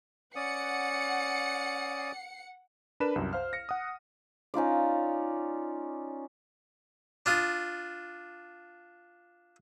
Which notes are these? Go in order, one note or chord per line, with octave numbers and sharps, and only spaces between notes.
C#4 D5 F#5 D#6 C#7
D4 A#4 B4 B5 E7
C2 F#2
C5 F5 F6
A#6 C#7
F#5 D#6
C#4 D#4 F4 D5
D4 F4 D#6